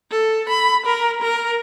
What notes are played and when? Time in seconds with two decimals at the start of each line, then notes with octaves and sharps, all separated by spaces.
0.10 A4
0.49 B5
0.86 A#4
1.22 A#4